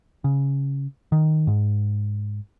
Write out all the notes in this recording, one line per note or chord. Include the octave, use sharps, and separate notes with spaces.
C#3
D#3
G#2